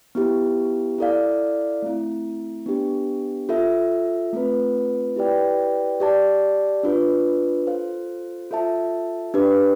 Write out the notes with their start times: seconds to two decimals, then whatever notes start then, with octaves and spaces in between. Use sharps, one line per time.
0.15 B3 E4 G4
0.98 E4 A4 D5 F5
1.82 A3 C4 E4
2.66 B3 D4 G4
3.49 F4 A4 E5
4.33 A3 C4 F4 B4
5.16 E4 G4 B4 D5 G5
6.00 G4 D5 A5
6.83 D4 F4 B4
7.67 F4 A4 C5 F5
8.51 F4 A4 E5 A5
9.34 D4 G4 B4